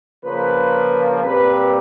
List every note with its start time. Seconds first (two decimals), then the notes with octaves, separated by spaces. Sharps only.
0.24 C#3 F3 A#3 B4
1.20 A#2 G3 C4 B4